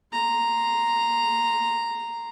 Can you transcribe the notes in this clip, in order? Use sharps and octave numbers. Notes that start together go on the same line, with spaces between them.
A#5 C6